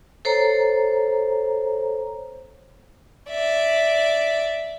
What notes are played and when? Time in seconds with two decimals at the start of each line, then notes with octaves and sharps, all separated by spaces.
0.25 A4 C5 C#5 A#5
3.30 D5 E5